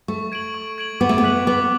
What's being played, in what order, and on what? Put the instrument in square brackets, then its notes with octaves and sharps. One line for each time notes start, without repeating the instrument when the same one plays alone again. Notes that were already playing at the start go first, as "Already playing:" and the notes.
[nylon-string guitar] A3 [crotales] C#6
[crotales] G#6 D7 F#7
C#6
G#6 D7 F#7
[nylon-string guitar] B3 [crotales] D6
[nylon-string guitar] A3
B3
[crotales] F#6 B6 F#7
[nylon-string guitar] B3 [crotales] D6